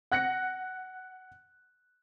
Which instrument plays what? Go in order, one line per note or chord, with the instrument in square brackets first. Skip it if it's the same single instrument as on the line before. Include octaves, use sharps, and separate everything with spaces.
[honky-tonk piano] F#5 F#6 A#6 C#7